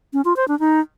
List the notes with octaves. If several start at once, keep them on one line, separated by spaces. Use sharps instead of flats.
C#4
F4
C5
D4
D#4